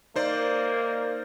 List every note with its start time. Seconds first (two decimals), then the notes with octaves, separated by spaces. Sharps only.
0.16 A#3 D#4 C5 D5